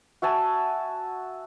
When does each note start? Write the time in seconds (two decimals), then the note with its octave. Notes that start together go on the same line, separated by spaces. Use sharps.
0.22 F#4 E5 G#5 A5